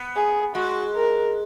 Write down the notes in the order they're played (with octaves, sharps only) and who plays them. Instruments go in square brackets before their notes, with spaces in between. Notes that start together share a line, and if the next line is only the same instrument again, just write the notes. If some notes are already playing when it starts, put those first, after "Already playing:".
Already playing: [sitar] B3
[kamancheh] G#4
[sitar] G#3 [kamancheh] F#4
[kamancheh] A#4